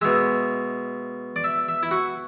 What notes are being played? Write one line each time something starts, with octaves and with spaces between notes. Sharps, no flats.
B2 G#3 E5
D5
E5
E5
E4
F#4